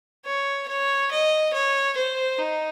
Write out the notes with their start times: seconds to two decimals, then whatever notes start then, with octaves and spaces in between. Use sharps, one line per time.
0.25 C#5
0.68 C#5
1.11 D#5
1.53 C#5
1.97 C5
2.39 D#4